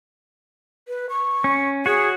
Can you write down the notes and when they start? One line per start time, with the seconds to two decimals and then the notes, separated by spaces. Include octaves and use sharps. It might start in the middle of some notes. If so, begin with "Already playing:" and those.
0.88 B4
1.09 C#6
1.44 C#4
1.86 F#4 G#4 C#5